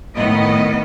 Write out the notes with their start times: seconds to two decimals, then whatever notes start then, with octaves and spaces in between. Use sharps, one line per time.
0.15 A2 D#3 B3 D#5